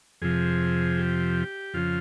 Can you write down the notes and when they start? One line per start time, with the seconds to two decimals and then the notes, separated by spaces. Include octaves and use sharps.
0.22 F2 C3 F3 G#4
0.98 G4
1.74 F2 C#3 F3 F4